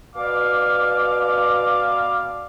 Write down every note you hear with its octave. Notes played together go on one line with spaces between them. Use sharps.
B2 D5 F5 D6